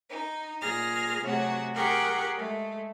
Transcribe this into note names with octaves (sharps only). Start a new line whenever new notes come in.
D#4
A#2 G#4 F6 A#6
C3 F#3 A3 F#4 G#4
G4 G#4 A#4 F#5 G5 C#6
G#3 A3